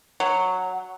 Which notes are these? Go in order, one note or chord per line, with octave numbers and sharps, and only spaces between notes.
F#3